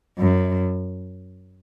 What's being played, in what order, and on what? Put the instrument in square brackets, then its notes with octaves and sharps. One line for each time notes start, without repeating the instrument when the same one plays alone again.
[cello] F#2